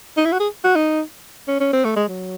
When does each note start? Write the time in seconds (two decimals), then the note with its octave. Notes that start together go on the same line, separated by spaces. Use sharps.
0.17 D#4
0.25 E4
0.33 F#4
0.40 G#4
0.64 F#4
0.76 D#4
1.48 C#4
1.60 C#4
1.73 C4
1.85 A3
1.96 G#3
2.08 F#3